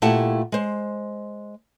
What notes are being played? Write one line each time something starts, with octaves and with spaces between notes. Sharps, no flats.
A#2 A3 E4 G4 F#5 A5
G#3 C5